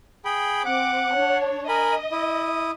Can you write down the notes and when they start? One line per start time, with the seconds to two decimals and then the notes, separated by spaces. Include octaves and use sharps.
0.25 G#4 G5 B5
0.65 C4 F#5 D6
1.15 D4 C#5
1.68 A#4 D#5 G#5 B5
2.12 E4 D#6